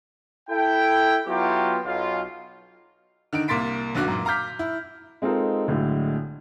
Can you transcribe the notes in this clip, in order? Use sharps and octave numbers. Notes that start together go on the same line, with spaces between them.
E4 A4 G5
F#3 B3 E4 F4 G4
B1 F4
D3 D#3 D#4 D7
C2 A#3 C6 A6 B6 D7
F1 B1 D3 F#4 D6
F#2 A#2
F5 A#5 D6 F6 G6 B6
E4
G#3 C4 D#4 F4 A4 A#4
B1 A2 D3 G#3